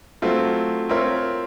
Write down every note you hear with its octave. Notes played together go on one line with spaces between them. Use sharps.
F#3 A3 C4 F4
C4 F4 A#4 C#5 E5